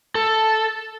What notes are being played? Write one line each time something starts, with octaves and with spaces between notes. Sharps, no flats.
A4